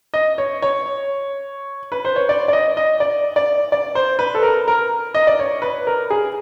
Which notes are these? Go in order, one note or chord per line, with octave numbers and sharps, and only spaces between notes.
D#5
C#5
C#5
B4
C5
C#5
D5
D5
D#5
D#5
D5
D5
D5
C5
B4
A4
A#4
A#4
D#5
D5
C#5
B4
A#4
G#4